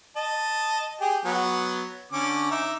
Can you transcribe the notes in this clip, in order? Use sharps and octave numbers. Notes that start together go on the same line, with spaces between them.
D#5 A5
G4 G#4
F#3 B3
D3 C#4 D6
D#4 E5 D6